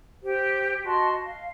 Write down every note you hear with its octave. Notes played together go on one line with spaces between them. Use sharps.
G4 C5 G5
F#4 D#5 A5 C6
F5